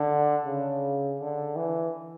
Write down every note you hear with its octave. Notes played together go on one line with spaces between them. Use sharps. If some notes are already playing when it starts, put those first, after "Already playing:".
Already playing: D3
C#3
D3
E3